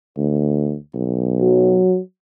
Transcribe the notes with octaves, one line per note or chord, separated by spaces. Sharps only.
D2
B1
F#3